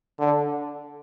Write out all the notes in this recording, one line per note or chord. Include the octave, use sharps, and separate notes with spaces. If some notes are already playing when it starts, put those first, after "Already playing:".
D3